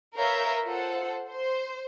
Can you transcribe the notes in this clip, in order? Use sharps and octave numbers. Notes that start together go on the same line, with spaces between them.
A#4 B4 C#5 E5 F5 G6
F4 A4 C5 F#5
C5